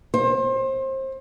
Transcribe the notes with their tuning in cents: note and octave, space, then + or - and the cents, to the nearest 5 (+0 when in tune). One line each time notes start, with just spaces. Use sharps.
C5 +30